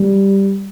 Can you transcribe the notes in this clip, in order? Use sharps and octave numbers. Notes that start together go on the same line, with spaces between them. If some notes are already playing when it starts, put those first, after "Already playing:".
Already playing: G3